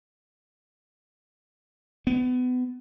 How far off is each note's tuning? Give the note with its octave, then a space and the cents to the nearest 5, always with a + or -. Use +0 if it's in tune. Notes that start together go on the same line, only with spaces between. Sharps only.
B3 +25